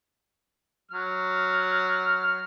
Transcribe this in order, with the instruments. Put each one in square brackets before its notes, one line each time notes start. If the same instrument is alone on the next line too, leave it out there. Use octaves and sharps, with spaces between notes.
[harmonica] F#3 F6